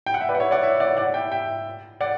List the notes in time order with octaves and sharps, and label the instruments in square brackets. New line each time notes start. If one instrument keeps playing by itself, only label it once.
[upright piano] G5
F#5
E5
B4 D5
F#5
C#5 E5
D5 F#5
C#5 E5
D5 F#5
D5 F#5
E5 G5
E5 G5
D5 F#5